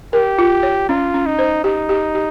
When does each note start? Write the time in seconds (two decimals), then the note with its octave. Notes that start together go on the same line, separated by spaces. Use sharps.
0.13 G4 A#4
0.39 F4
0.63 C#5
0.89 C#4 F4
1.14 C#4
1.26 D#4
1.39 C5
1.64 D#4 G4
1.89 G4
2.15 G4